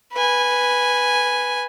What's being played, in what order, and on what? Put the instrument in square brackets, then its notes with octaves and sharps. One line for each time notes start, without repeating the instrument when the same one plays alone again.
[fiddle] B4 G#5